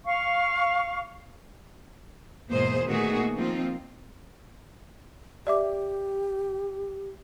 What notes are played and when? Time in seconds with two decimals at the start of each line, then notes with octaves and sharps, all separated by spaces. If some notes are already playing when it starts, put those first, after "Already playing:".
0.04 F5 C#6
2.51 E2 G#2 B2 A#3 G#4 C5
2.87 A#2 D#3 A3 B3 F#4 G#4
3.35 F3 A#3 C4 D#4 F4
5.47 G4 D5 E5 D6